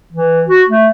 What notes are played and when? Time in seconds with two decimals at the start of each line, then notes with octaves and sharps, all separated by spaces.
0.12 E3
0.49 F#4
0.69 A3